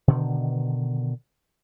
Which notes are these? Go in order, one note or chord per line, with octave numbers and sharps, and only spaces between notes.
B2 D3 D#3